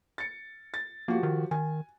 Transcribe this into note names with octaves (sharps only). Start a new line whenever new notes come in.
A6 C#7
A6
F3 A#3 F#4 G4
D#3
D#3 G#5